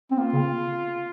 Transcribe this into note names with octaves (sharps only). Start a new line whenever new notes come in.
C4
A#3 F4
C#3